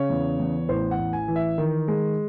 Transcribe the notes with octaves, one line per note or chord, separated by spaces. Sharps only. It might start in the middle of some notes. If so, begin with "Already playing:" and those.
Already playing: C#3 C#5
E2
E2
A1 C5
F#5
A1
G#5
E3
E5
D#3
G#3